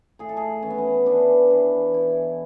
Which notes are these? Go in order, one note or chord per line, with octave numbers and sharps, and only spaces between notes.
A2 G#4
A4
G#4
E3 C#4
B3
C#4
E3 D4
E3
B2 E4